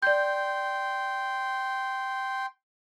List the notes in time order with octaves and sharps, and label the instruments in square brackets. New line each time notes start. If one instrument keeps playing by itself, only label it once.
[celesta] D5 G6 [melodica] G5 C6